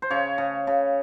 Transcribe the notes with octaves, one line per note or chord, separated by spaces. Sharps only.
C5
C#3 C#5
C#3
C#3